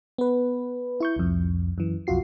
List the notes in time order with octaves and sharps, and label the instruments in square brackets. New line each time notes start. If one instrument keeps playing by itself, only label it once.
[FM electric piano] B3 B4
E4 C#6 G6
C2 F2
F#2 E3
B1 F2 F4 F#4 C7